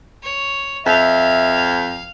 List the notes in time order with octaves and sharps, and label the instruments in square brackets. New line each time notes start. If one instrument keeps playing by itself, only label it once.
[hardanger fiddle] C#5
[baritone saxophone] F2 [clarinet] E5 [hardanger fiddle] F5